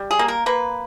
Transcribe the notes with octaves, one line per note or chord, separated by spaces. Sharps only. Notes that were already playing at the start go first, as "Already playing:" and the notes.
Already playing: G3
G#4
A#3
A#4
A#3 B4